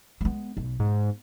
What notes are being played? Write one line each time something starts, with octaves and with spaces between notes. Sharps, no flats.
G#3 B3
B1
G#2 B3